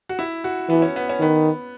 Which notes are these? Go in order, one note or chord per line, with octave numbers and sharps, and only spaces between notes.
F#4
E4
F#4
E3 B3
C#4
B3
C#4
D#3 B3